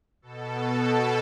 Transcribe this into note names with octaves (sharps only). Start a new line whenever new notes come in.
B2 A4